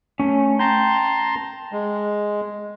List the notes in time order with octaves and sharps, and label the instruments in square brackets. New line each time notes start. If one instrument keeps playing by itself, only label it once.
[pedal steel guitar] A3 C#4
[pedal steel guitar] G5 [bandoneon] A5 A#5 C6
[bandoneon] G#3